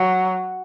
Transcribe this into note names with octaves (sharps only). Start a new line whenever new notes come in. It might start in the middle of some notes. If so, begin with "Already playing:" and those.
Already playing: F#3